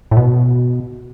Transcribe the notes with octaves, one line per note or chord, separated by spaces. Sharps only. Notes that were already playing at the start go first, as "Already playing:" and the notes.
A2
B2